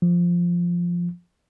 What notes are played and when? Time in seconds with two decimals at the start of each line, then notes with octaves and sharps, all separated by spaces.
0.02 F3